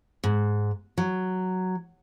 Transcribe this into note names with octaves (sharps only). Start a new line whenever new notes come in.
G#2
F#3